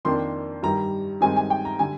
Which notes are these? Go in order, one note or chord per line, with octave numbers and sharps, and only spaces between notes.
F2 D#3 A#3 D4 C6
G2 D#3 G3 A#5
G2 D#3 G#3 C4 D#4 G#5
G#5
G5
A#5
D3 G3 G#5